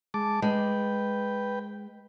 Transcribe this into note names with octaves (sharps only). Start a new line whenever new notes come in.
G#3 A5 D6
G#3 B4 G5